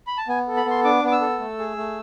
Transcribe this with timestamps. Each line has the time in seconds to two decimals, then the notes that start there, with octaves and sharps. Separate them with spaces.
0.07 B5
0.17 A5
0.28 B3 G#5
0.48 A4
0.57 B5
0.66 B3 C6
0.84 D4 D6
1.04 B3 D6
1.12 E6
1.21 A4
1.40 A3
1.59 G#4
1.77 A3